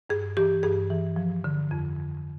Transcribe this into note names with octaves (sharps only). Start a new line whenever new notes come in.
G2 G#4
E3 G4
G2 G#4
E3
F3
D3
F2